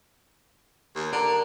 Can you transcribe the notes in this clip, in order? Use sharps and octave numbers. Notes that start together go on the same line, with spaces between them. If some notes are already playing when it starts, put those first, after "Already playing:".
D#2
D3 A#4